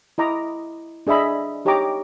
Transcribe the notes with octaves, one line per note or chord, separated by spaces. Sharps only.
E4 D#5 A#5 D6
D4 G#4 D#5 E5 B5
D#4 G4 C#5 D#5 A#5 D6